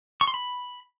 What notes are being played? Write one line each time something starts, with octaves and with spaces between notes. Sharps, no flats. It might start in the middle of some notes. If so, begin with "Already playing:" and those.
C#6
C6
B5